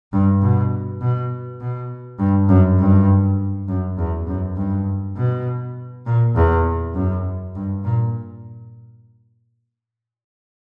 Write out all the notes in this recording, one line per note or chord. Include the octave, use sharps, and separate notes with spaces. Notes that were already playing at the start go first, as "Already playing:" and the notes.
G2
B2
B2
B2
G2
F#2
G2
F#2
E2
F#2
G2
B2
A#2
E2
F#2
G2
A#2